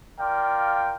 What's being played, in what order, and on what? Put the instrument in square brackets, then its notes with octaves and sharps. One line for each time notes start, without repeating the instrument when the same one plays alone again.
[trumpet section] F4 A#4 D5 F5 G5